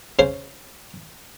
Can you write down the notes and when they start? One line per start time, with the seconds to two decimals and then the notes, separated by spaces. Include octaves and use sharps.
0.19 C#3 C5 C6